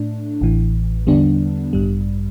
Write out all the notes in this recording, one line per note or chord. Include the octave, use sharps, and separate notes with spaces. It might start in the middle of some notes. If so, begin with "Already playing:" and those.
Already playing: A2 A3 D4
A1 A2 E3
E2 D3 G3 B3 D4
A1 G2 G3